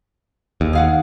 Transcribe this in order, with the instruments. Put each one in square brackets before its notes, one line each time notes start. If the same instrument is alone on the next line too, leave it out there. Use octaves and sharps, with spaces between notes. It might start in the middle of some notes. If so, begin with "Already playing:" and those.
[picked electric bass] D#2
[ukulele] G#4 F5 F#5